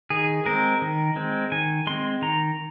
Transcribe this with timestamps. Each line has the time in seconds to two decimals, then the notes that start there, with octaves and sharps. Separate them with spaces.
0.10 D#3 G#4
0.46 G#3 C4 A#4
0.82 D#3
1.16 G#3 C4
1.52 D#3 G#5
1.87 G#3 C4 C6
2.22 D#3 A#5